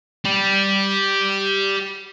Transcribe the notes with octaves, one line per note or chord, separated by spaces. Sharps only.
G4 D5